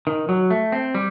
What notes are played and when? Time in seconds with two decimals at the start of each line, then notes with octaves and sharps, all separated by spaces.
0.07 D#3
0.29 F#3
0.50 A3
0.72 C4
0.95 G3